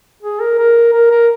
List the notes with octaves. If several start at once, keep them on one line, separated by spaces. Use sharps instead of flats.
G#4
A#4
A#4
A#4
A#4